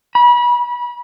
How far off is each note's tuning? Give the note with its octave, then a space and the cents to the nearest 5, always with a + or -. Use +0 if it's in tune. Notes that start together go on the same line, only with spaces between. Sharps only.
B5 -30